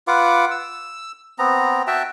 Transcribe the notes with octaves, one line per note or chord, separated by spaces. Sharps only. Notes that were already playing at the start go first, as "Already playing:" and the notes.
F4 B4 F#5 D6
E6
B3 C4 A#5
F#4 E5 G5 A5